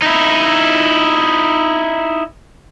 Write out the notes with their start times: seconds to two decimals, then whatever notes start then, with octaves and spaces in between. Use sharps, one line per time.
0.02 D#4 E4